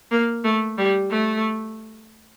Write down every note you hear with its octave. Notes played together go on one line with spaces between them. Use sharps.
A#3
A3
G3
A3